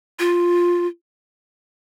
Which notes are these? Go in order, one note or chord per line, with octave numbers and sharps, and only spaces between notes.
F4